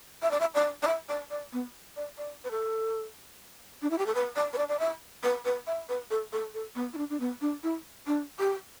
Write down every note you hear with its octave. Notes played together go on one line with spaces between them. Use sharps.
E5
D5
E5
D5
D5
E5
D5
D5
B3
D5
D5
B4
A4
D4
E4
G4
A4
B4
D5
B4
D5
D5
E5
B4
B4
E5
B4
A4
A4
A4
B3
E4
D4
D4
B3
D4
E4
D4
G4